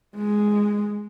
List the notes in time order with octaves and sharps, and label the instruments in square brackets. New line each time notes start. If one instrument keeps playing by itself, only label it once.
[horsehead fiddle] G#3